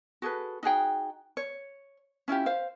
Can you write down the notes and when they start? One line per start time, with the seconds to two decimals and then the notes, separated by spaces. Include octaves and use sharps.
0.22 F#4 G#4 A4 B4
0.63 D#4 F#4 G#4 G5
1.37 C#5
2.28 C#4 E4 F4 G4
2.46 C5 F5